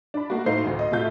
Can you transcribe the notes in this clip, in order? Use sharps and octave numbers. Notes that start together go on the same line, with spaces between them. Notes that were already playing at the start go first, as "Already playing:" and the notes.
D4 B5
A3 A#3 F#4
A2 F#3 D#4 C5 F5 C7
A1 D2
D#5
A2 C3 A3 F4 G6